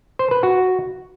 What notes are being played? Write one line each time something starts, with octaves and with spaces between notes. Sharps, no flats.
C5
B4
F#4